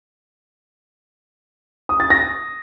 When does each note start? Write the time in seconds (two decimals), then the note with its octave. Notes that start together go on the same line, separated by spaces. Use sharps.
1.89 D#6
2.00 A6
2.10 A#6